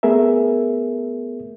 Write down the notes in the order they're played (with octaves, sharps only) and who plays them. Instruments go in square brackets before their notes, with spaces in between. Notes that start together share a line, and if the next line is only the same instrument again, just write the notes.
[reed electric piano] A3 B3 G#4 A#4 E5